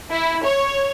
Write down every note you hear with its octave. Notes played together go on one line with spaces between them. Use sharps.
E4
C#5